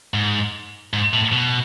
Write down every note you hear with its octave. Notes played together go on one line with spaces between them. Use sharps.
G#2
G#2
A2
B2